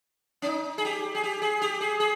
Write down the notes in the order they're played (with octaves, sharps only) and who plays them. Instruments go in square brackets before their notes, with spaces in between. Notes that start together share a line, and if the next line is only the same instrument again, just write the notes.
[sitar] C#4
D#4
G#4
G4
G#4
G4
G#4
G4
G#4
G#4